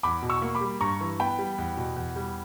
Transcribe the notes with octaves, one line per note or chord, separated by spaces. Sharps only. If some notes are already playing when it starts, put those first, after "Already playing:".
E2 B5 D6
B2
C#6 E6
A#3
B5 D6
G3
G2 A#5 C#6
E3
B3 G5 B5
G3
E2
B2
E2
G3